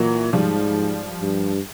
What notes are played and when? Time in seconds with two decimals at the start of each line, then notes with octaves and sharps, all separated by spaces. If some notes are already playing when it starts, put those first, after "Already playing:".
Already playing: A#2 E3 F#3
0.33 G#2 F3 G3
1.21 G2